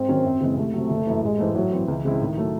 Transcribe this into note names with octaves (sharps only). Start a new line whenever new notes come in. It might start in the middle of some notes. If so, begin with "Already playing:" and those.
Already playing: G#2 C4
D#3 F#3 C#4
F#2
C#3 E3 G#3
C2 A3
C3 F#3
F#1
F#2 E3
A1 G#3
G#2 E3 A3
A2 F#3
E3 C4
C#2 E3
C#3 G#3 C4 E4
A2 D#3
F#3 A3